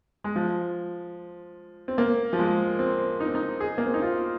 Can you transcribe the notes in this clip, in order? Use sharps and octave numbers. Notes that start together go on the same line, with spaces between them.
G#3
F3
C4
A#3
F3
G#3
C4
D#4
C4
D#4
G#4
A#3
C4
D#4
F4